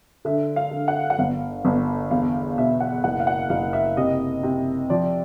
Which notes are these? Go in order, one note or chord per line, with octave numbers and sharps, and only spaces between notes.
D3 E5
F5
D3
F#5
F#5
G1 F5
G1
E2 F5
B2 E5
F#5
F#1 F#5
F5
F#5
F#1 F5
E5
C3 D#5
C3
F3 D5